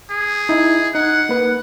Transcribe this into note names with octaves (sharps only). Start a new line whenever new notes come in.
G#4
D#4 E4
D#4 F#5
A#3 B4